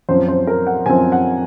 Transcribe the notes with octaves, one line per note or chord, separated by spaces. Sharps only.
F#2 F3 C4 C5
C5
A#4
F#5
F#2 F3 C4 G#5
F#5